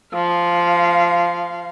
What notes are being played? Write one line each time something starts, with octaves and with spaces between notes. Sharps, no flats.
F3 F5